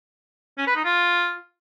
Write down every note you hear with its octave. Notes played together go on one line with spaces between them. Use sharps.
C#4
B4
D#4
F4